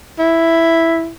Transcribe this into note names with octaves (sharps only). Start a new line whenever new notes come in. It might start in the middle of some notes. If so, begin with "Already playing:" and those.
E4